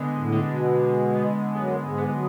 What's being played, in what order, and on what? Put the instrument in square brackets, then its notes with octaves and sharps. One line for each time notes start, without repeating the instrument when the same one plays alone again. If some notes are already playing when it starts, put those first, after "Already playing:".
Already playing: [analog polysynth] D3 G#3 B3
[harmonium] A2
[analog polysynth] D3
[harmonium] B2
[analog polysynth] B3
B3
[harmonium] F#2 F#3 [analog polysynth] B3
[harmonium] G#2 G#3
[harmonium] G#3 [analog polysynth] B3
[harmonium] F#3